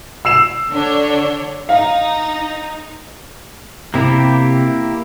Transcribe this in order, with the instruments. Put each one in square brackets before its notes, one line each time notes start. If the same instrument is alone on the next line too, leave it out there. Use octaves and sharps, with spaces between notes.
[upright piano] E6 C7 E7
[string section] D3 D4 C#5
[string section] D#4 [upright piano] F5
[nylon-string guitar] C3 [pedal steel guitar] A#3 E4 G4